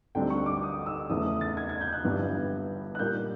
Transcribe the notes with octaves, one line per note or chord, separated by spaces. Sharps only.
D2 D3 G3 C4 D#4 G5
C#6
D6
D#6
E6
E2 C#3 E3 A3 D#6
D#6
A6
G#6
G#6
G6
F#6
G1 G2 E3 G3 B3
F#6
A#2 G3 A#3 D#4 G6